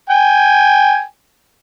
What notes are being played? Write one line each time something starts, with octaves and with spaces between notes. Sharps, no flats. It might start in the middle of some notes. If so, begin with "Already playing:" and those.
G5 G#5